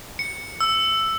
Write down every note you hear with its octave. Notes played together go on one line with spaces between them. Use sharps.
C#7
E6